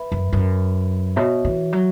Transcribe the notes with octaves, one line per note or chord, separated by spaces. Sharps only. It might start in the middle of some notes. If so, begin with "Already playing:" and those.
Already playing: B4 E5 B5
F#2
F#2
B2 F#4 C#5 E5
E3
F#3